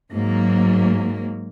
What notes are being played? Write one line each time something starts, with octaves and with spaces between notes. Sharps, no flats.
G#2 F#3 A#3